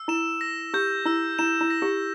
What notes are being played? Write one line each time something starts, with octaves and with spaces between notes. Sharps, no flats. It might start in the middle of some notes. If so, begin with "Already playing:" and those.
Already playing: E6
E4 E7
A#6
G4 G6
E4 E6
E4 E7
E4
A#6
G4